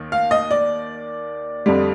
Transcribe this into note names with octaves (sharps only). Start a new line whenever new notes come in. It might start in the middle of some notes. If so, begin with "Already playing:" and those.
Already playing: D#2 D#3
F5
D#5
D5
F2 D3 G3